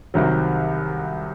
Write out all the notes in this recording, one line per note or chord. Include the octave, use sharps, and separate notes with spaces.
C2 C3 D#3 F#3